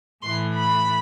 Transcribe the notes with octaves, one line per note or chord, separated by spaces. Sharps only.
A2 E3 C6
B5